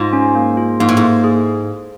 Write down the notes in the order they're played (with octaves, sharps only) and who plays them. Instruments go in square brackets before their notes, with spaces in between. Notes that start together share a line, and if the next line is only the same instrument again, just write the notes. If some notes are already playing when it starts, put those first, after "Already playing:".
Already playing: [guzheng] G#2 [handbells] F4
[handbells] C#4
A#3
F4
[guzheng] G#2 [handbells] A#3
[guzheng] A2
G#2
[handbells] A#3
G#4